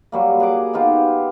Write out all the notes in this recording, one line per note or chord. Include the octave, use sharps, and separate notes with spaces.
F#3 G3 A#3
G#4 F#5 D6
B3 D#4 F4 G4